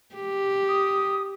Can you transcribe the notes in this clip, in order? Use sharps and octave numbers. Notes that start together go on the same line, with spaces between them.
G4
D#6